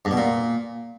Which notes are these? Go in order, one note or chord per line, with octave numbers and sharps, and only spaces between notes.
G2
B2
A#2